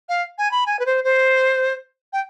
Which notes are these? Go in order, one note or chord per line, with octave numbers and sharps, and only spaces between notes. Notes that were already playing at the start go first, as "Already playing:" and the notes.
F5
G#5
B5
G#5
B4
C5
C5
G5